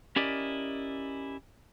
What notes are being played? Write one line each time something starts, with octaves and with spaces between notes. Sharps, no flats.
C#4 E4 G4 A#4 D5 D#5